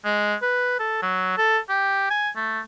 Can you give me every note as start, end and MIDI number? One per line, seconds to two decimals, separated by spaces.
0.05 0.35 56
0.42 0.75 71
0.79 0.98 69
1.02 1.37 54
1.38 1.58 69
1.69 2.09 67
2.10 2.30 80
2.36 2.60 57